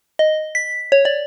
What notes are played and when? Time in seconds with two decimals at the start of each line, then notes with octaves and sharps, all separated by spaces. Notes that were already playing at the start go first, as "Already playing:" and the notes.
0.19 D#5
0.55 B6
0.92 C#5
1.05 D5